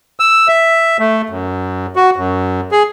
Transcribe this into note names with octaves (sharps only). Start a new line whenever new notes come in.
E6
E5
A3
F#2
F#4
F#2
G#4